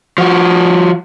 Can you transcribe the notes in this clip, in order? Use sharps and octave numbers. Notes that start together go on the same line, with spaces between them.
F3 F#4